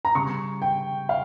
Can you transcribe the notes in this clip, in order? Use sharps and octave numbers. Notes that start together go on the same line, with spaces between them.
A#5
C#3 G3 C#4 C#6
G5
F5